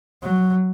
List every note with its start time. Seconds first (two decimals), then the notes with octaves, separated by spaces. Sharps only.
0.23 F#3